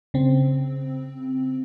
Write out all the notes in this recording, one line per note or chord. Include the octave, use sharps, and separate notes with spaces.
C#3 C4